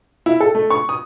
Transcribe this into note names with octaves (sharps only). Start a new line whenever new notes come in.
E4
A4
A3
C#6
D#6